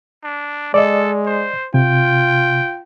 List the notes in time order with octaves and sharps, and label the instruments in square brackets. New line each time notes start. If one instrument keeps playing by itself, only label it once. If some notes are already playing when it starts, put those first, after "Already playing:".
[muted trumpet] D4
[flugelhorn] G#3 [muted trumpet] A4 [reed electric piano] D5 D#5
[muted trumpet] C5
[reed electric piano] C3 [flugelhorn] F4 [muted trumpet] G5